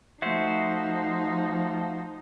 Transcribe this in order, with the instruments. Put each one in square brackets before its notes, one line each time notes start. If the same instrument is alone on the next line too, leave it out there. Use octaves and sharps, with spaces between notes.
[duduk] F3 [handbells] A3 E5 [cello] D#4 [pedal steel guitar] F#4 C5